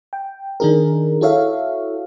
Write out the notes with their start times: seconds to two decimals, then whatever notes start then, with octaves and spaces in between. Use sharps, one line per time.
0.13 G5
0.60 D#3 D4 D#4 G#4 A#4
1.21 E4 F#4 A4 C#5 E5 F5